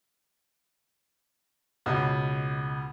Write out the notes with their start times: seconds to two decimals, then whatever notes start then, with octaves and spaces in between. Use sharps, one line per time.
1.86 C#2 B2